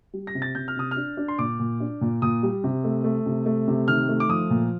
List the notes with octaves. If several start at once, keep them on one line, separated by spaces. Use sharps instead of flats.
G3
A#6
C3
A6
C3 G6
F6
C3 D#6
F6
D4
D4
C6
A#2 D6
A#2
D4
A#2
A#2 D#6
G3
C3
A3
A3
C3
A3
C3
D#3 F6
A3
D6
F3 D#6
A#2